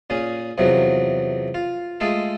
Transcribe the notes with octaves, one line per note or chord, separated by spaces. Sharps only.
A#2 C#4 G#4
E2 C3 F3 F#3 F#4
F4
G#3 A3 F4 G#4 A4